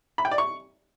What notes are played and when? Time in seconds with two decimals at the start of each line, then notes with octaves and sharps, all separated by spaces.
0.18 B5
0.25 G5
0.32 D5
0.38 C#6